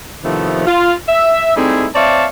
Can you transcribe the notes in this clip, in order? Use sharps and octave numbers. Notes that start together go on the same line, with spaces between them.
A2 C3 D#3 F3 A3 B3
F4
E5
G3 A3 C4 D#4 E4 G#4
C4 C#5 D5 E5 F5 A5